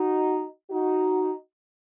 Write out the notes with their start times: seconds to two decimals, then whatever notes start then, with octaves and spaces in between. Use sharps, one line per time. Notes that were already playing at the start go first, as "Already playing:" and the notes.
Already playing: D#4 F#4
0.70 D#4 F#4